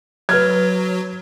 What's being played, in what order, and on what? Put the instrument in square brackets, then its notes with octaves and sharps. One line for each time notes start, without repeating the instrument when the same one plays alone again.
[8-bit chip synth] F#3 [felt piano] B4 F6 G#6